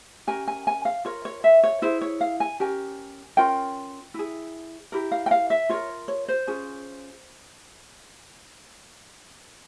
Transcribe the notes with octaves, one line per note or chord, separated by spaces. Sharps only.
C#4 G4 A#4 G#5
G#5
G#5
F5
F4 A#4 C#5
C#5
E5
C#5
E4 G#4 C5
C#5
F5
G#5
C#4 G4 A#4 G#5
C#4 F4 A#4 G5
E4 G#4
E4 G4 A#4
F5
G5
F5
E5
F4 A#4 C#5
C#5
C5
C#4 F4 G#4